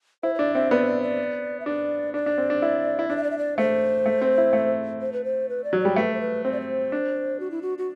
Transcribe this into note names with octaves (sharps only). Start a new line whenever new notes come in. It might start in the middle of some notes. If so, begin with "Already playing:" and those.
E4 C5
C5
D4 D5
C4 E5
B3 D5
D5
D5
E5
D4 D5
D4 D5
D4
C4
D4
E4
E4
D4 D5
E5
D5
E5
D5
A3 C5
A3
C4
E4
A3
C5
B4
C5
B4
D5
F#3
G3 D5
A3 B4
C5
B4
C4 C5
D5
C5
D4
F#4
E4
F#4
F#4